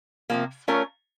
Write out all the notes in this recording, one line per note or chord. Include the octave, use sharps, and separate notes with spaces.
C3 F3 A#3
A3 C#4 F4 A#4 C#5